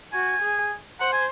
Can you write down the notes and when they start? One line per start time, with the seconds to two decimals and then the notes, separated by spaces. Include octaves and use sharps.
0.13 F#4 G#5
0.42 G#4
1.00 C5 F#5
1.13 G#5